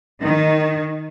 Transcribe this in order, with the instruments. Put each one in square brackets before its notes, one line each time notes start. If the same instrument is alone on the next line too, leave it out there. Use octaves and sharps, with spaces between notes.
[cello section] D#3